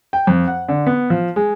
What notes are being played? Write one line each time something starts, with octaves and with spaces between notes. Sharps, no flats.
G5
F2
F#5
D3
B3
F3
G#3